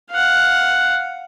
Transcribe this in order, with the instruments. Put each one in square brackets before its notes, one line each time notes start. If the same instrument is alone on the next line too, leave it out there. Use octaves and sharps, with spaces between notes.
[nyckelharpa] F5 F#5